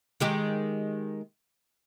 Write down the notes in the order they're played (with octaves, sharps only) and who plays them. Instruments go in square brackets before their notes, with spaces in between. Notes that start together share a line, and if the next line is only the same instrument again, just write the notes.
[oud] D#3 G#3 G4